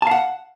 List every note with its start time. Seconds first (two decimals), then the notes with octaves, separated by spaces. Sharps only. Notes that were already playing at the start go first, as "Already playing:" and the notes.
0.02 A5
0.07 F5
0.11 F#5